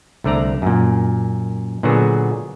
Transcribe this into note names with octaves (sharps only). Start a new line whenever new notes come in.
C2 D3 A3 D5 A#5
F#2 A#2
A#2 D3 F#3 B3 F#4 G#4